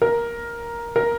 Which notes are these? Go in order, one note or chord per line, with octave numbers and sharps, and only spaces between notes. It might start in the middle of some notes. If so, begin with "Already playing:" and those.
A#4
A#4